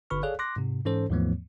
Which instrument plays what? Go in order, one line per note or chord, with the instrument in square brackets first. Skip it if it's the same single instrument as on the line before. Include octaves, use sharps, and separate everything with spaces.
[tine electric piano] G1 D3 B4 B5 C#6 F6
G#4 A4 C#5 D5 F5 F#6
C6 D6 F#6 A#6
G#2 C3
G#2 E3 C#4 A4 C5
D#2 G#2 E3 F3 A3 B3